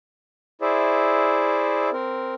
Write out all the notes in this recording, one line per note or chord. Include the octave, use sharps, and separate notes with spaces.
E4 G#4 C5 D5 E5
C4 A#4